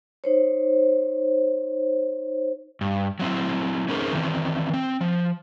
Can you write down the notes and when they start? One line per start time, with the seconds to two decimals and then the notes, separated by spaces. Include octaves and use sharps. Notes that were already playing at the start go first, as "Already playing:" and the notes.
0.24 D#4 C5 C#5
2.81 G2
3.19 F#3 C4 E4
3.88 C4 C#4 D#4 G#4 A#4 C5
4.13 D#3 E3 C4
4.73 C4
5.01 F3